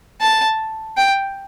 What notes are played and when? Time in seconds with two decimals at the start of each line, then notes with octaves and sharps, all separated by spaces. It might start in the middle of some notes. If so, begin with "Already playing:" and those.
0.21 A5
0.97 G5